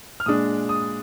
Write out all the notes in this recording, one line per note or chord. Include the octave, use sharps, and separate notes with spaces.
F6
A#2 G#3 D4 D#6
D#6